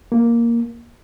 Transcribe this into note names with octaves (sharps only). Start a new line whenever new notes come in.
A#3